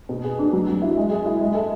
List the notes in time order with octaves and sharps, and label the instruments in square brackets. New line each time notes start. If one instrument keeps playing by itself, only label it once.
[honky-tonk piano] B2
G#4
D4
F#3
F#3
E4
G#3
G#4
E4
G#3
A4